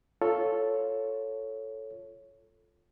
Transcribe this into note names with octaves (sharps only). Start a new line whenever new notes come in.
F4 A4 C#5